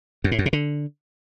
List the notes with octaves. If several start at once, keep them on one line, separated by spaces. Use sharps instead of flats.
F#2
A2
F#2
C3
D3